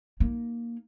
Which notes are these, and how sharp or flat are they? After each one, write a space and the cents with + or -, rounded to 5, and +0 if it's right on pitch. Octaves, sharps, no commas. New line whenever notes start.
A#3 +5 D#4 +0